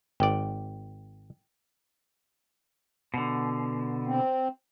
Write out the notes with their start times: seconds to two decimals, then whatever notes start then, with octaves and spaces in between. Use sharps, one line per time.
0.20 G#1 D5 G5
3.14 B2 D3
4.06 C4